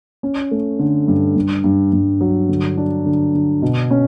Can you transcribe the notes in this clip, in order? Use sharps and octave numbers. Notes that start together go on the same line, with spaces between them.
C#4
A3
D3
G2
G2
G2
G2
F#3
D3
D4
D3
D3
B2
C#4